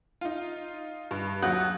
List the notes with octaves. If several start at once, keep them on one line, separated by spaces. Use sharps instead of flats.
D#4 F4
G2
D#2 F#3 F#5 D#6 F#6 G6